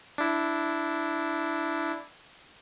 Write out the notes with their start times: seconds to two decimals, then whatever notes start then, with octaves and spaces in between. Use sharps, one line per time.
0.18 D4 E4